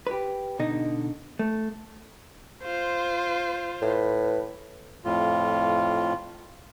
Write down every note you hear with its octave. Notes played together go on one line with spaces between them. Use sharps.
G4 B4
B2 D3 D#4 D#5
A3
F4 C5
A2 B4
F2 A2 F4